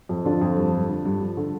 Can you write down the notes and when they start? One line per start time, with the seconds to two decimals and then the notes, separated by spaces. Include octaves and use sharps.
0.09 F2
0.25 D3 D4 F4
0.41 F2
0.57 G2
0.73 G2
0.89 D3
1.05 G2
1.21 F3
1.37 D3